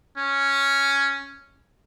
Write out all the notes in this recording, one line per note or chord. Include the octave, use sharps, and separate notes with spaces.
C#4